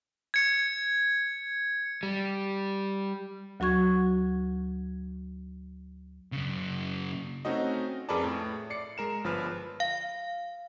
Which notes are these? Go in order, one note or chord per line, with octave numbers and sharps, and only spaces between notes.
G#6 C#7
G3
D2 F#3 F#4 C#6 G#6
F#2 C#3
A3 C4 C#4 D#4 F#4 D#5
F2 G#4 A#4 B4 D5 A5
A2
D5 C7 C#7
G#3 A#4 E7
G1 F3 B4 F6
F5